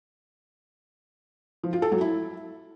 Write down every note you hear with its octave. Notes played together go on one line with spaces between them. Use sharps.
F3
F4
A4
F#3
E4